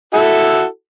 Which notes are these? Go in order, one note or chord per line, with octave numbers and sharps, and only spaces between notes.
E4 F#4 A4